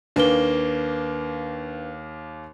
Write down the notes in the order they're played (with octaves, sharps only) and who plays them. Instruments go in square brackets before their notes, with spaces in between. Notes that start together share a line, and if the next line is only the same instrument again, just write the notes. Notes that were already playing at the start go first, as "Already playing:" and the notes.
[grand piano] D#2 A#3 [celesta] D4 B4 G7